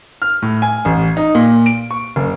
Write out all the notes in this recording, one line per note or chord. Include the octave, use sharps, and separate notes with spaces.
F6
A2
G#5
A1
D#4
A#2
D7
C#6
F#1